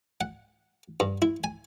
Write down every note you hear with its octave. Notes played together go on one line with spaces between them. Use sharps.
F#5
G2
E4
G#5